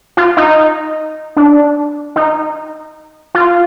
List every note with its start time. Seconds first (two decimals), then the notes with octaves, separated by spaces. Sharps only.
0.17 F4
0.37 D#4
1.37 D4
2.16 D#4
3.35 F4